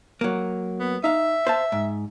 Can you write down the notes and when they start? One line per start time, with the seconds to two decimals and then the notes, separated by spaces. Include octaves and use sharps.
0.21 F#3 A#3
0.80 B3
1.04 D#4 E5 F5
1.47 C5 F5 A5
1.72 G#2